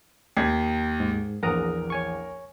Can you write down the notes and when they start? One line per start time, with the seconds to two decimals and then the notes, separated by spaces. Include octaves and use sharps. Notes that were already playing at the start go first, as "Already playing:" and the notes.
0.37 D#2 G#6 B6 C7
1.00 G#2
1.43 A#1 E2 A#4 F#5 A#5 D#6
1.90 C#5 G#5 C#6